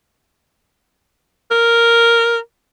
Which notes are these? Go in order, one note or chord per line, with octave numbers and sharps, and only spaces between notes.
A#4